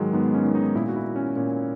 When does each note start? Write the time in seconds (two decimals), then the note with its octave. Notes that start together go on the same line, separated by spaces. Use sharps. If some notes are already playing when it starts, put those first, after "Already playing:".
Already playing: G#2 D#3 F#3 G#3
0.13 G#2 B3
0.34 C#4
0.45 D#3
0.55 D#4
0.75 A#2 E4
0.88 F#4
0.96 E4
1.16 C#4
1.36 A#2 C#4